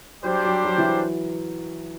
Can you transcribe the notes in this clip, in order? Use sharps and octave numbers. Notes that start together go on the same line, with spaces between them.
F#3 G3 D4 G4 C5
F#3
F#3
E3